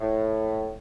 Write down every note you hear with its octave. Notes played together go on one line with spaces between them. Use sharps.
A2